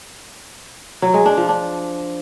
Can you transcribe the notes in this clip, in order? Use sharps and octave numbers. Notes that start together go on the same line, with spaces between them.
F#3
G#3
D4
F3
D4